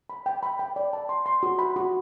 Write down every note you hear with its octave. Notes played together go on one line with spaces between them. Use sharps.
B5
G5
B5
G5
D5
A5
C6
C6
F#4
B5
F#4